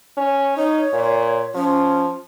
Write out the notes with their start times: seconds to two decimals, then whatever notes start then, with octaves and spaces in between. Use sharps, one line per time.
0.17 C#4
0.57 D#4 C#5
0.94 A#2
1.55 F3 C#4